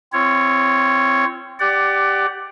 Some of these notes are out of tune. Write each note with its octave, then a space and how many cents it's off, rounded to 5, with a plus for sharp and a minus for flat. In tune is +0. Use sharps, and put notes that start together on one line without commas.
C4 +0 F4 -35 C#5 +0
G4 +5 D5 +0 F#5 +25